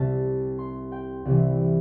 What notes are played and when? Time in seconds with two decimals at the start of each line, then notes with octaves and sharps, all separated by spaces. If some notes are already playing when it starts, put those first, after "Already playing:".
Already playing: C2 C3 G3 A5
0.58 C6
0.92 G5
1.25 C2 C3 E3